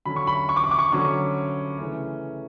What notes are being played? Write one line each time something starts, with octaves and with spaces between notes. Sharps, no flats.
D3 F#3 C#4 B5
C#6
B5
C#6
D6
C#6
D6
C#6
D3 F#3 C#4 C#6
C#3 E3 A3 C#4